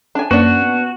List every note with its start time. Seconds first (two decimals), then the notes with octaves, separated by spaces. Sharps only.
0.15 D4 G#5
0.31 F#2 A#3 C#4 D4 F#4 B4
0.62 B3